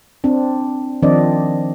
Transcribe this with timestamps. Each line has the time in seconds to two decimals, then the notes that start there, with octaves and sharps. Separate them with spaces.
0.24 C4 D4
1.02 D#3 F3 C4 D4 D5 D#5